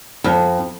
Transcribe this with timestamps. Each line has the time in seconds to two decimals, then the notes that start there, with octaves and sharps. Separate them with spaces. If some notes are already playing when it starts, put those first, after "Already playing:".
0.24 F2